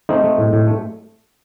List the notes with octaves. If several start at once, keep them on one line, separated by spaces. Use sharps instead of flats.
A3 C4 D#4
A3
A2
A2
A3